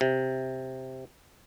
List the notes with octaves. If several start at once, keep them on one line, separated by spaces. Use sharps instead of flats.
C3